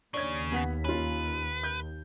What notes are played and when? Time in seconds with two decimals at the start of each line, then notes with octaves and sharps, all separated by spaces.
0.14 D#2 C#3 D4 C#5 G#6
0.52 B3 F#5 B6
0.85 C#4 F4 B4
1.64 G6